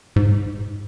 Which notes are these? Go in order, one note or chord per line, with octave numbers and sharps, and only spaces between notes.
G#2